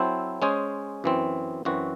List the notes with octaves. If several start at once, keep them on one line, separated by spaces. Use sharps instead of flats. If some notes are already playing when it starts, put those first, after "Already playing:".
Already playing: F#3 C4 E4 A4 C5
G#3 C#4 G#4 C5
F#2 E3 C4
F#2 E3 C4 F#4